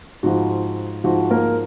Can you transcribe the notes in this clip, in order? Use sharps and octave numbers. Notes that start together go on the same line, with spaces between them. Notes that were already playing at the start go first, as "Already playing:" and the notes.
G#2 F3 F#4
G#2 F3 F#4
A#3 A#4